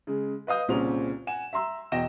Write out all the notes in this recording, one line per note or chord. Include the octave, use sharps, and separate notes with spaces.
C#3 G#3
B4 D#5 F5 D#6 G6
C2 A#2 C#3 C4 C#4 F7
F#5 G#5 E7
E5 A#5 C6 E6
E2 B2 D#5 G5 A#6 E7